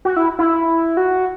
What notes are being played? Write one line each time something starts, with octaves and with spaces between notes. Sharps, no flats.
F#4
E4
E4
F#4